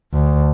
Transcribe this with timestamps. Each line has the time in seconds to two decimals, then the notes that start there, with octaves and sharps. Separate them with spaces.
0.14 D2